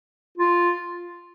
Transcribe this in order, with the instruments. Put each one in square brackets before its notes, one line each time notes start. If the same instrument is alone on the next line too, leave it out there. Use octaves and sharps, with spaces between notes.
[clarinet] F4